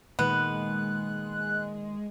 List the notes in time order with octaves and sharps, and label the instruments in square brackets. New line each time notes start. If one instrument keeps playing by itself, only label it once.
[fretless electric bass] A#2 D#3 [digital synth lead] G#3 [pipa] B3 [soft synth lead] F#6